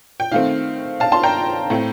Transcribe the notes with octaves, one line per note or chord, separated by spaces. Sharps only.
G5
D#3 A3 C4 F5
F5 A5
A5 C6
G5 A#5
A2 A3 C4